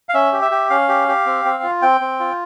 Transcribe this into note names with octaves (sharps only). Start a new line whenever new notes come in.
F5
C#4 E5
G4
E5
G4
C#4 F5
G4
G4
C4
C4
F4
C4 G5
C4
F4